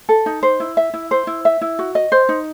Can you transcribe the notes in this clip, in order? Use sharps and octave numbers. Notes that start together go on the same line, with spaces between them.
A4
D#4
C5
E4
E5
E4
C5
E4
E5
E4
F#4
D#5
C5
D#4